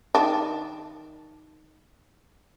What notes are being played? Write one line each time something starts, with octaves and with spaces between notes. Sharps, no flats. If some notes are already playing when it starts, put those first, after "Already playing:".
D#3 D4